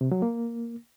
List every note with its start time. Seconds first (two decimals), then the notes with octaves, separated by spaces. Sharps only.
0.01 C3
0.12 F#3
0.22 A#3